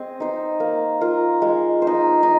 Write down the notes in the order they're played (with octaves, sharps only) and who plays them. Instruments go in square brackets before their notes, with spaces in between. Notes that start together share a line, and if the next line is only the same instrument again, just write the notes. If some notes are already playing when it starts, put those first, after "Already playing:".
Already playing: [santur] C4 G#4 D#5
D#4 C5
A#3
F4 A#4
G#3
C5
D#4
D#4